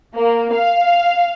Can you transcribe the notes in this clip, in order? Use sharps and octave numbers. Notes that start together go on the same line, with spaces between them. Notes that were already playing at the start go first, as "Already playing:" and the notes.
A#3
F5